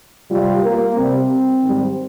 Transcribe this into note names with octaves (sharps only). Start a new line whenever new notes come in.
C3 G3 F4
A#3
C3 G3 C4
G#2 D#3 G3